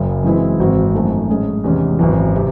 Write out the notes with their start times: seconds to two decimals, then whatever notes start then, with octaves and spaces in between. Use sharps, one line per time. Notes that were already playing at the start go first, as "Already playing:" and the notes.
Already playing: F#1 F#2 C#3
0.24 F#2 E3 G#3 C4 E4
0.59 G#1 G#2 E3 C4 F#4
0.94 F#2 D#3 A3
1.29 A2 G#3 C#4 G#4
1.64 E2 C3 D#3 G#3 C#4
1.99 G#1 F#2 E3
2.36 C3